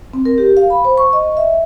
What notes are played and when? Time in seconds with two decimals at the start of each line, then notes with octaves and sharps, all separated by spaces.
0.13 C4
0.25 A#4
0.38 G4
0.57 F5
0.70 B5
0.85 C5
0.98 C#6
1.13 D#5
1.37 E5